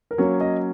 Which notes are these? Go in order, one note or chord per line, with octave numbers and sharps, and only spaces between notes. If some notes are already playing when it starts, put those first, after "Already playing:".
A#4
F#3 A#3 C#4 C#5
D#5